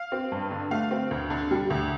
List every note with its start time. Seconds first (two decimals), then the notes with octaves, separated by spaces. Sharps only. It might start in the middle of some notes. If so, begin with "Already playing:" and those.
Already playing: F5
0.12 C4
0.32 G2
0.51 D3
0.71 A3 F5
0.91 C4
1.11 D2
1.30 D3
1.51 G3
1.70 D2